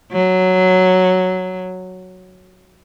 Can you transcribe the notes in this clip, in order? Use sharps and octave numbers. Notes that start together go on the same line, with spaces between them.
F#3